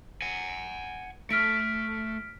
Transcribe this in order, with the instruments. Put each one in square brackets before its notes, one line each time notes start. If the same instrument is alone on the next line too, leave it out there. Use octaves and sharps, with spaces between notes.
[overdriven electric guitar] F#5 G#5
[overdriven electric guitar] A3 [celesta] F6 B6 D7